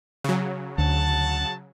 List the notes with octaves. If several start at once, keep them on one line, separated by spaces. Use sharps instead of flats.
C#3 F#3
D2 F#5 A5